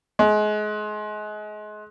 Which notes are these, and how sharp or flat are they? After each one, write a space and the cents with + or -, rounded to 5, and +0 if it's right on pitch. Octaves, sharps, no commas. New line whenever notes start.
G#3 +30